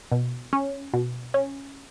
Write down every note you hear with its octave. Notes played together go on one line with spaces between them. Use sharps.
B2
C#4
B2
C#4